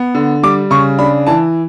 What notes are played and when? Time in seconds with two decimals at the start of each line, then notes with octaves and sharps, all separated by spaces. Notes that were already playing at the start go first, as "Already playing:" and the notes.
Already playing: B3
0.15 D3
0.43 G3 D6
0.71 C#3 C#6
0.99 D4 B5
1.27 E3 A5